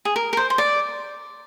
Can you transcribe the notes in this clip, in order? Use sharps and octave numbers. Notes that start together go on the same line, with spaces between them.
G#4
A#4
A#4
C5
C5
D5